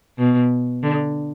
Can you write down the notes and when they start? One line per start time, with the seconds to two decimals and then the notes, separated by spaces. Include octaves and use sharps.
0.18 B2
0.83 D3